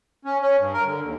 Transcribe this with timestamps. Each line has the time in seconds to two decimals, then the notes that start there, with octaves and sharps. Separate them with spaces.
0.25 C#4
0.42 C#4
0.59 G2
0.74 A#4
0.85 D3
1.04 D#2